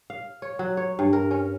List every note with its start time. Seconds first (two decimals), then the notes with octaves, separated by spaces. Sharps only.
0.10 F5
0.42 C#5
0.59 F#3
0.77 C#5
0.99 G2
1.13 A#4
1.31 C#4